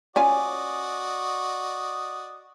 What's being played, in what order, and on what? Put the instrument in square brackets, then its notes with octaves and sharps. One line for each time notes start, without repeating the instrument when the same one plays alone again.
[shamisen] C#4 F4 G#5 [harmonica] F#4 D5 D#5